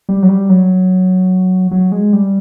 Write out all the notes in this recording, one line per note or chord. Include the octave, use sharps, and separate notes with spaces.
G3
F#3
G3
F#3
F#3
G#3
G3